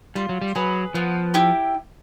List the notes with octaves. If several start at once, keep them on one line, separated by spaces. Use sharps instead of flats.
G3 F4
F#3
G3
F#3 G#4 B4
F3 B3
E4 G4